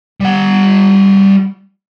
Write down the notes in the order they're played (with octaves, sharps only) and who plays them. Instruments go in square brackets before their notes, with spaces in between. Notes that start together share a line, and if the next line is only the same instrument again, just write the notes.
[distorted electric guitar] G3 F#5